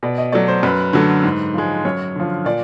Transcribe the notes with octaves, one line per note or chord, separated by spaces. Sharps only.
B2 D5
D#5
F#3 A3 D5
C5
F#2 B4
D3 F#3 A3
G#2
F3 G#3
F#2 C#5
D3 F3
A#2 D5